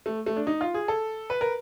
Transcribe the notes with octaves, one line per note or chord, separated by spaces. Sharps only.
A3
A3
D4
D#4
F4
G#4
A4
B4
A#4